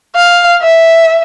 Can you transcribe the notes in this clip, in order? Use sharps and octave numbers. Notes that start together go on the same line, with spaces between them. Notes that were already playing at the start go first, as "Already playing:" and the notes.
F5
E5